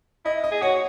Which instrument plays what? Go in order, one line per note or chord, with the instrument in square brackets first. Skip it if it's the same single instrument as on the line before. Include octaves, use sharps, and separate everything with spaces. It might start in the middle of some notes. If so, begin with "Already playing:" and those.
[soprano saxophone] E4 [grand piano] D#5
[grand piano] D#5
[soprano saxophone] G#4
[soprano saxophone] F#4 [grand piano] C#5